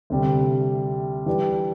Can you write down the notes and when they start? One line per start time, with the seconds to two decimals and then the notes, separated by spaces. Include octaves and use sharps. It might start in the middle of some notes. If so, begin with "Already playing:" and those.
0.10 D2 C3 G3
1.26 E3 G3 D4